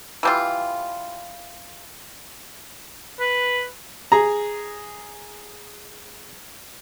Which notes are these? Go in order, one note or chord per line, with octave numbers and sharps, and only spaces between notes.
E3 G3 F4
B4
G#4 A#5